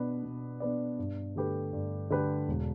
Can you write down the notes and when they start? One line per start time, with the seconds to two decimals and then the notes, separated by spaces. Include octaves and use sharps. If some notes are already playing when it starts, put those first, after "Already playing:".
Already playing: B2 B3 D4 B4 D5
0.23 B2
0.60 B3 D4 B4 D5
0.99 G2
1.36 D3 A3 G4 B4
1.73 G2
2.10 D3 A3 G4 B4
2.48 E1